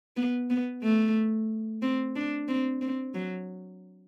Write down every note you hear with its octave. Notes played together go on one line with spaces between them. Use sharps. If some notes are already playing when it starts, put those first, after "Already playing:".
B3
B3
A3
C4
D4
C4
C4
F#3